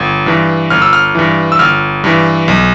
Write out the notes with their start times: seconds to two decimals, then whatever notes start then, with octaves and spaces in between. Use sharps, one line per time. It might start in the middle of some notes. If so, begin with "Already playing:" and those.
Already playing: G1
0.26 G2 E3
0.70 G1 F6
0.82 E6
0.93 F6
1.15 G2 E3
1.52 E6
1.59 G1 F6
2.04 G2 E3
2.48 B1